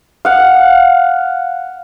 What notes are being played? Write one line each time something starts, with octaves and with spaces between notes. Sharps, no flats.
F5 F#5